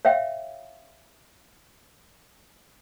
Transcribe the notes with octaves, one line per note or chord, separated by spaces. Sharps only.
C#5 E5 F5 G5